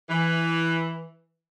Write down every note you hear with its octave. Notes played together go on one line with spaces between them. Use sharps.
E3